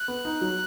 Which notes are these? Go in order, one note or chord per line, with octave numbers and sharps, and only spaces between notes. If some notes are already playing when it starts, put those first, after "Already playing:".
Already playing: F#6
B3
D#4
F#3